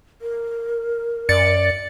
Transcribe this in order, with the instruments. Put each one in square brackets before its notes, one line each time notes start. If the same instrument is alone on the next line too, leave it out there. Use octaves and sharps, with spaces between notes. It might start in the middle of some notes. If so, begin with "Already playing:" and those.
[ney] A#4
[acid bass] F#2 [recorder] D5 [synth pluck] A6 C#7